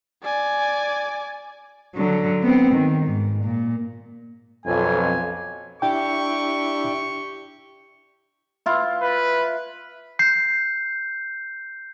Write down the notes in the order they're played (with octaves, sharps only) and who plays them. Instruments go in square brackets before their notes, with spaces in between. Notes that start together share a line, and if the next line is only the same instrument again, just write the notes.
[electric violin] D5 G#5
[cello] D3 F#3
B3 C4
D#3
G#2
A#2
[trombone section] B1 F2 [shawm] G#5
[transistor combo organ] D4 E4 [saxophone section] G4 [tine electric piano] G5 [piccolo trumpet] C#6
[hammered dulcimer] E4 F4
[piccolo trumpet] B4
[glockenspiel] G6 C7